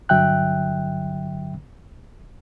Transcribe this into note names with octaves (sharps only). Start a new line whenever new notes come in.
G2 D3 F#3 E5 G5 F#6